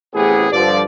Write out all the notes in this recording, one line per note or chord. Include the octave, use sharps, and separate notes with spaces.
A1 A2 C3 B3 G#4
G2 D3 F3 D5